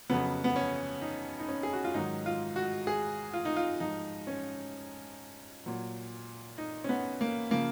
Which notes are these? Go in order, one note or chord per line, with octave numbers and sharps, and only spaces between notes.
F2 C#3 F#3 B3
B3
C#4
D#4
D#4
C#4
G#4
F#4
F4
G#2 D#3 F#3 D#4
F4
F#4
G#4
F4
D#4
F4
G#2 F3 D#4
C#4
A#2 F#3
D#4
C#4
B3
A#3
C#3 F3 A#3